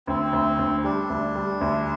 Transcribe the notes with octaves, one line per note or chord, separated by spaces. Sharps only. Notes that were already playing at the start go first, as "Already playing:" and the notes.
D2 C4
D2
D2
G3 D4
D2
G3
D2